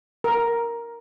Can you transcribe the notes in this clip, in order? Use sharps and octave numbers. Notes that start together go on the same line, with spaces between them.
A#4